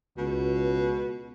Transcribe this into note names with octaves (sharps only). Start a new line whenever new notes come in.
C#2 B2